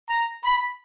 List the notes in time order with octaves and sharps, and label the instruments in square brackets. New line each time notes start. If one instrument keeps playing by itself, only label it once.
[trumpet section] A#5
B5